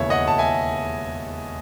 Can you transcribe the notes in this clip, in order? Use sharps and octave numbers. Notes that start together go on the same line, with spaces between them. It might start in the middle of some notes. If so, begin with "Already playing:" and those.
Already playing: E1 D#2 C#3 E3 C#5 E5
D#5 F#5
A5
E5 G#5